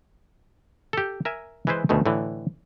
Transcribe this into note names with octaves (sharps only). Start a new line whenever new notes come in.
G4 A4
A#4 E5 G#5
E3 G#3 E4 B4 C5
D2 B2 D#3 A3
A2 D3 E3